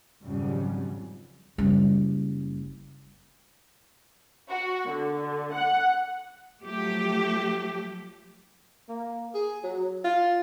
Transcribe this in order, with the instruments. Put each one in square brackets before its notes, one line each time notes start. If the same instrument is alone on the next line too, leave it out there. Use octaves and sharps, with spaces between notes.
[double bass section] G#1 F2 G#2 C#3 F#3 G3
[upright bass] F#1 G3
[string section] F#4
D3
F#5
[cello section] F3 F#3 A3 G4
[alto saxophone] A#3
G#4
F#3
F4